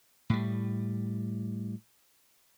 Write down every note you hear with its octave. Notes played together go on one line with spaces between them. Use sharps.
A2 G3